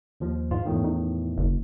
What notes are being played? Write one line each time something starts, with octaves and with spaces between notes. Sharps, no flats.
D#2 F3
G#2 F4
E2 A2 D#3
D#4
F#1